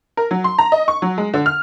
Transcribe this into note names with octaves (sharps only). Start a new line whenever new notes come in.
A#4
F#3
C6
A#5
D#5
C#6
F#3
G#3
D3
F6